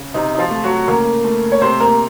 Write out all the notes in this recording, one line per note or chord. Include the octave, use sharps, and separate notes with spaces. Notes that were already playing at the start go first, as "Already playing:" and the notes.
Already playing: C#3
C3 D#4
D#4
F3 F4
A3
F#3 F#4
C#3 A#3 A#4
A3
C#5
C3 C4 C5
A#3 A#4